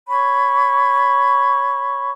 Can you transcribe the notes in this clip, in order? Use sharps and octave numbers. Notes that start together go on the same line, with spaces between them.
C#5 B5 C#6